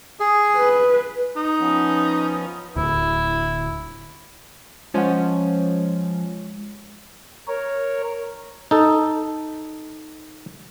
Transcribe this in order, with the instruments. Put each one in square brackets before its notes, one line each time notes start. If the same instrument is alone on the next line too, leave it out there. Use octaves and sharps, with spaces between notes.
[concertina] G#4
[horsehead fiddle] B4
[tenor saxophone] D#4
[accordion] F3 B3 C#4
[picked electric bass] D1 D2 [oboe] E4
[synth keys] F3 C#4 [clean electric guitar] G#3 C5 F#5
[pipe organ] A#4 C#5
[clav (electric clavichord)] D#4 A4